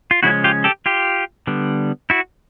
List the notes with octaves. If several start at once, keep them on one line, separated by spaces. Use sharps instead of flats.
F4
C#3 F3 G#3 C#4 E4 F#4
F4 G4
G4 A4
F4 G4
D3 G3 B3
E4 F#4